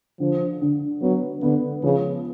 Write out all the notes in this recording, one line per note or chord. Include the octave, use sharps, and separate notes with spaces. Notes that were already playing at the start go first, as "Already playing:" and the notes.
D3 F3
D3
F#3 B3
D3 B3
C#3 F3